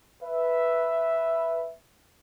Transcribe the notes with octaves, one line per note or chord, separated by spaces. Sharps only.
B4 E5